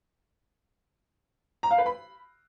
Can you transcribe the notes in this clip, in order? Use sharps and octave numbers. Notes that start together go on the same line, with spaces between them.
A#5
F5
B4
B5